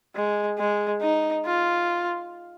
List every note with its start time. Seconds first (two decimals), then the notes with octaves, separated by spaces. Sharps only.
0.15 G#3
0.59 G#3
1.02 D#4
1.46 F4